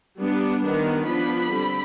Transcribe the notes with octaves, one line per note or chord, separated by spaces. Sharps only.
G3 B3 D4
D#3 G3 B3 D4
F3 B3 D4 B5
D3 G3 C4